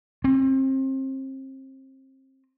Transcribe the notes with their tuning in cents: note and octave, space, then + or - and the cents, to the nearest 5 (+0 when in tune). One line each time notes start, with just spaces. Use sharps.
C4 +30